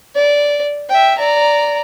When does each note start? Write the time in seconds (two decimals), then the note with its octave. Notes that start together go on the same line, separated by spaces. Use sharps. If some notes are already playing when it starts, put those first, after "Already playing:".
0.15 D5
0.90 E5 G5
1.18 D5 A#5